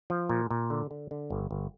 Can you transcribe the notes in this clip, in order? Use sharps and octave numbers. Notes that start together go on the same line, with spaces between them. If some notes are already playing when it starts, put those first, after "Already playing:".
F3
A#2
A#2
D3
D3
D3
G1
G1